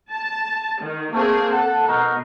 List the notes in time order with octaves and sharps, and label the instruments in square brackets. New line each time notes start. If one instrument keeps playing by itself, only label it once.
[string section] A5
D#3
[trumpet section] A3 [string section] A#3 C4 G#4
[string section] A4 [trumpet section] F#5 A5
[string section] B2 [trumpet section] D#4 F#4 A#4